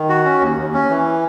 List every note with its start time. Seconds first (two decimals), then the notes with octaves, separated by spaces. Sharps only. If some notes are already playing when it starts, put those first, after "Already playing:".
Already playing: D#3
0.09 F#4
0.25 C#4
0.41 D#2
0.57 D#2
0.74 C#4
0.90 E3